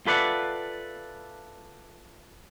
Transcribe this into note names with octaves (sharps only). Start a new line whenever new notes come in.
F4 A4 B4 D5 E5 F#5